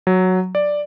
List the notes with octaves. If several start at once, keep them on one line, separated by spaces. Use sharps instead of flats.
F#3
D5